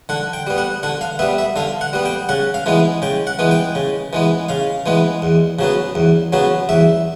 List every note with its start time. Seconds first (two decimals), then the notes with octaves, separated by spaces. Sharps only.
0.09 D3 F#5
0.33 G5
0.47 G3 B3
0.58 F#5
0.83 D3 F#5
1.01 F5
1.19 B3 E5
1.22 G3
1.38 E5
1.56 D3 F5
1.81 F#5
1.93 G3 B3
2.06 G5
2.29 C#3 F#5
2.54 F5
2.66 E3 G#3 B3
3.02 C#3 G5
3.27 F#5
3.39 E3 G#3 B3
3.51 G5
3.75 C#3
4.13 E3 G#3 B3
4.49 C#3 F5
4.86 E3 G#3 B3
5.22 E2
5.59 C#3 F#3 B3
5.95 E2
6.33 C#3 F#3 B3
6.69 E2 E5